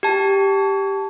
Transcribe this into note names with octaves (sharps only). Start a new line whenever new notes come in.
G4 A5